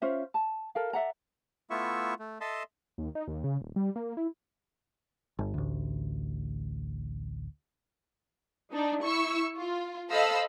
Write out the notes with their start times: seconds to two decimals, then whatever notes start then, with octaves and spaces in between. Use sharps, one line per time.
0.02 C#4 F4 C5 E5
0.34 A5
0.75 A4 A#4 F5
0.93 D5 E5 F#5 A#5
1.70 A3 B3 E4 F4 E5 C#6
2.19 A3
2.41 A4 D#5 E5 A5 C6
2.98 D#2
3.15 D#4
3.28 D#2
3.44 C#3
3.61 D#1
3.76 G3
3.96 A#3
4.17 E4
5.39 G1
5.54 A1 D2
8.72 D4 D#4
9.02 E4 C#6 E6
9.56 F4
10.10 A4 C5 D#5 F5 B5 E6